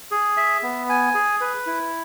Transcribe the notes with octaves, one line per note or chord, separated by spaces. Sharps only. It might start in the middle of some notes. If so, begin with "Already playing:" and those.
G#4
E5
B3
G#5
G#4
B4
E4